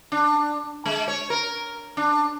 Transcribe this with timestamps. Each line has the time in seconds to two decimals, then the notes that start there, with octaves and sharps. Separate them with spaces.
0.12 D4
0.86 G#3
1.08 C#5
1.30 A#4
1.97 D4